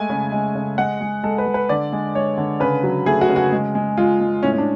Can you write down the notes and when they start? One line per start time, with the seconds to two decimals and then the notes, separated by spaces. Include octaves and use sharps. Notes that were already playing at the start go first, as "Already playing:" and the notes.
Already playing: G#3 A3 G#5
0.10 C#3
0.32 G#3
0.55 C#3
0.78 G#3 F#5
1.01 G#3
1.23 G#3 A4
1.38 B4
1.46 G#3
1.54 B4
1.69 D3 D5
1.92 G#3
2.15 G#3 C#5
2.38 D3
2.60 C#3 B4
2.83 F#3
3.06 A3 G#4
3.21 F#4
3.29 C#3
3.36 F#4
3.52 G#3
3.75 G#3
3.97 G#3 F4
4.20 G#3
4.43 A2 C#4
4.53 C#4
4.58 D4